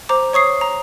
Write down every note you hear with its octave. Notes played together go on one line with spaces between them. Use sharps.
C5 A#5 D6
C#5 C#6 D#6 C7
A#5